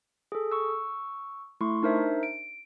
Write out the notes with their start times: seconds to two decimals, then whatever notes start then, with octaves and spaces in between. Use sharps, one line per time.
0.32 G#4 A4
0.52 C#6 E6
1.61 A3 E4 C6 C#6
1.83 D4 D#4 A#4 C5 E5
2.23 D7